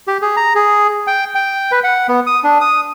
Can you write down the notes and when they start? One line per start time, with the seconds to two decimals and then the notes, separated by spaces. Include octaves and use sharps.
0.08 G4
0.22 G#4
0.37 A#5
0.55 G#4
1.07 G5
1.35 G5
1.71 B4
1.84 F#5
2.08 B3
2.27 D#6
2.44 D4
2.61 D#6